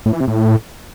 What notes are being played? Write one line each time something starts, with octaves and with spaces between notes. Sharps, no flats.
A2
E3
C3
A2